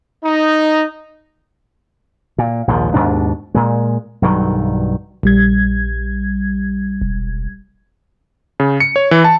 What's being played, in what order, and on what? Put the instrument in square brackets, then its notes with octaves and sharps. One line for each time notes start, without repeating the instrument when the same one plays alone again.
[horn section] D#4
[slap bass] A#2
A#1 D#2 G#2 F3
D#2 G#2 B2 D4
A#2 G#3
B1 G2 D#3 F#3
[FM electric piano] A#1 G3 G#6
[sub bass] E1
[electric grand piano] C#3
C#7
C#5
E3
A5